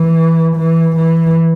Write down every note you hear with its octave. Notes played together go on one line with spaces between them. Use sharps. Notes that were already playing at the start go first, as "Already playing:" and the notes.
Already playing: E3
E3
E3